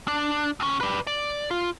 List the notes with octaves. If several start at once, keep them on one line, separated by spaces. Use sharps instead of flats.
D4
D#2 C#4
B4 D5
D5
F4